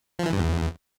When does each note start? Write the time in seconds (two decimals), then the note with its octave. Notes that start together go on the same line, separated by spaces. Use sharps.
0.19 F3
0.26 E3
0.33 G2
0.39 E2